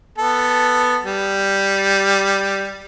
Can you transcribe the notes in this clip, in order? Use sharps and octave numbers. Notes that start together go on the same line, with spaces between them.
B3 A4
G3